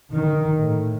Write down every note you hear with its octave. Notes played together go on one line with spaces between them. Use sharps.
D#3
A2